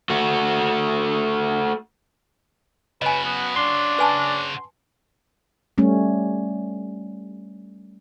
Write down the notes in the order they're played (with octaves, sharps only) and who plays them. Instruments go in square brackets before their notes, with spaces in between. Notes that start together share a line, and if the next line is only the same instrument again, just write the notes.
[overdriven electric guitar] A3 F#4
[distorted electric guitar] C#3 F#4 [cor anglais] B4 [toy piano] D#5 G#5
[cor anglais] B3
[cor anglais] D4 [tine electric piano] C6
[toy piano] B4 G#5 A5
[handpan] G3 A3 C#4